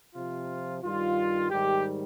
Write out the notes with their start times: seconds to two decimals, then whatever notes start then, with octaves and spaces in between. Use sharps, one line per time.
0.14 C3 F3 F4
0.82 G2 D#3 G3 F4
1.50 G#2 D#3 G3 G4